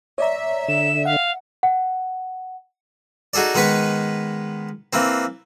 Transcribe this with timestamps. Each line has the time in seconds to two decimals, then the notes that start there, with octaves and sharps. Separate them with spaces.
0.18 C#5 D5 E5 A#5
0.68 D3 E7
1.05 F5 F#5
1.63 F#5
3.33 D#4 F#4 G#4 A4 D5
3.55 D#3 G#3 B3 B4 C#6
4.93 E3 A#3 C4